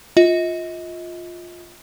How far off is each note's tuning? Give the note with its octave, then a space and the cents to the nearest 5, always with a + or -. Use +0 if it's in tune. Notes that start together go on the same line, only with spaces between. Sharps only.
F4 +10 D#5 +40